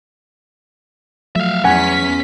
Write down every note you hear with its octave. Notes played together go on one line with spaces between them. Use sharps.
F3 F#3 A3 E5 F5
E2 C#4 F#5 G#5 B6